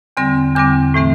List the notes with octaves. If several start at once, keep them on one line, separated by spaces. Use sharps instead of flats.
E2 D3 G3 C4 C6
E2 D3 G3 C4 D6
A2 E3 A3 C4